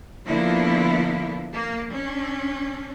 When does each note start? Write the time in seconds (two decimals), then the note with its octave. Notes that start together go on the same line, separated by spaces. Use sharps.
0.27 D3 F3 A#3 B3 E4 F4
1.54 A#3
1.92 C#4 D4